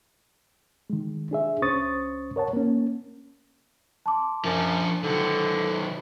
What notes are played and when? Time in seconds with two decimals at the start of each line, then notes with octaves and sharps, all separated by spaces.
0.90 D#3 G#3
1.31 D4 G#4 E5
1.62 C#2 C#4 C5 C#6 D#6 A6
2.36 A#4 C#5 F#5 A5
2.53 A#3 C#4
4.06 A5 C6 D6
4.44 F#2 F3 D4
5.04 D3 D#3 F#3